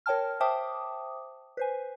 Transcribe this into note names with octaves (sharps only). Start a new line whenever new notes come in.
A#4 C#5 G5 A5 F6
C5 E5 G5 A5 D6 D#6
B4 C5 G#5